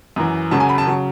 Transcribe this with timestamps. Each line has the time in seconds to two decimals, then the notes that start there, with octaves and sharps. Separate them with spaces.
0.16 F#2 E3
0.51 F#2 C#3 F#3 A5
0.60 G#5
0.69 B5
0.78 A5
0.87 C#3 F#3